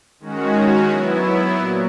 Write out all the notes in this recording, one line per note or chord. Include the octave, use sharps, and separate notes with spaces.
D#3 G#3 C#4 F#4
F#3 B3 E4
A#2 F#3